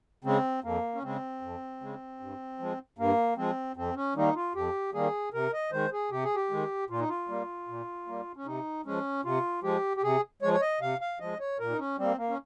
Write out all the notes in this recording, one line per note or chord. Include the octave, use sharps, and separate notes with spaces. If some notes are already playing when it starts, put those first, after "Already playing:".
C#3 G#3 C4
F2 A#3
C#4
C#3 G#3 C4
F2
C#3 G#3
G2
F3 G#3
G2 A#3
F3 G#3 C4
F2 C4
C#4
D#3 G3 A#3 D#4
F4
F2 G4
D#3 G3 A#3 G#4
C3 A#4
D#5
D#3 G#3 C5
G#4
C3 G4
G#4
G4
D#3 G#3
A#2 F4
D#4
F4
G3 A#3
A#2
G3 A#3
C#4
C3 D#4
F3 G#3 C#4
C3 F4
F3 G#3 G4
G4
C3 G#4
F3 G#3 C#5
C#5
D#5
C3 F5
F5
F3 G#3 D#5
C#5
A#2 A#4
D#4
C#4
G3 A#3 C4
A#3
C#4